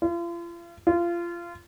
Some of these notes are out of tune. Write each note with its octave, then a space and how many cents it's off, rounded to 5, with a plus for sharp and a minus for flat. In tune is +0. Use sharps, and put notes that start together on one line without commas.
F4 -40
F4 -25